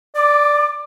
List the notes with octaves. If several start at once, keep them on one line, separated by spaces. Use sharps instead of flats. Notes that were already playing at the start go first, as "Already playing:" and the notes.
D5 D6